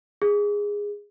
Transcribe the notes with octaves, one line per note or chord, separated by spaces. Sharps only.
G#4